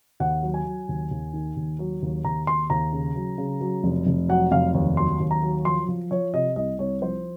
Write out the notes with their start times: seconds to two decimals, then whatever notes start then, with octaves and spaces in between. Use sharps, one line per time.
0.20 D#2 F#5
0.43 F#3
0.54 G#5
0.65 F#3
0.89 D#2
1.11 D#2
1.34 D#3
1.56 D#2
1.79 F#3
2.02 D#2
2.25 D#2 A#5
2.47 D#2 C6
2.70 D#2 A#5
2.93 C#3
3.15 F#3
3.38 C#3
3.61 F#3
3.84 F1
4.07 F1
4.29 F#3 F#5
4.52 F1 F5
4.74 D#2
4.97 F#3 C6
5.20 D#2
5.31 A#5
5.42 F#3
5.65 F3 C6
5.88 F3
6.11 F3 C#5
6.34 C3 D#5
6.56 C2 D#5
6.79 C2 C#5
7.02 F3 C5